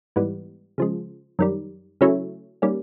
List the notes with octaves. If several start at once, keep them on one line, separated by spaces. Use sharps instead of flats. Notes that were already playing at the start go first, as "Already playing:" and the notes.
G#2 E3 G3 B3
C#3 F3 G#3
F#2 D#3 G3
C#3 F#3 A3 C#4 E4
D#3 G3 A#3 C#4